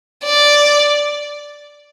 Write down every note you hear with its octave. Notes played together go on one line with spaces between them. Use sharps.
D5